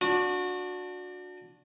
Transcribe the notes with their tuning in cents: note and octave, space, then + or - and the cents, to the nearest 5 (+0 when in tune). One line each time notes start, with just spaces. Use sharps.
D4 +0 F#4 -25